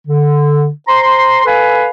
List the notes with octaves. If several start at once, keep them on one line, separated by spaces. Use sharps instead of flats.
D3
C5 A#5 C6
A4 B4 F5 G#5 B5